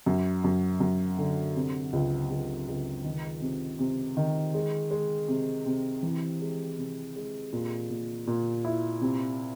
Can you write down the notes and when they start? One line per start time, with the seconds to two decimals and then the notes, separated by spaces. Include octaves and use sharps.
0.06 F#2
0.44 F#2
0.80 F#2
1.18 D3
1.56 C3
1.93 C#2
2.30 C#2
2.68 C#2
3.04 D#3
3.42 C3
3.79 C3
4.17 D#3
4.54 G#3
4.91 G#3
5.28 C3
5.66 C3
6.03 E3
6.41 G#3
6.78 C3
7.16 G#3
7.53 A#2
7.90 A#2
8.27 A#2
8.65 E4
9.01 C3